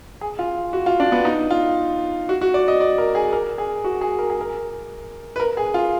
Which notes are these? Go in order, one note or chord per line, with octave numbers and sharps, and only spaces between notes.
G#4
F4
F#4
F4
D4
B3
D#4
F4
F#4
F#4
D5
D#5
D5
A#4
G#4
A#4
G#4
F#4
G#4
A#4
G#4
A#4
B4
A#4
G#4
F4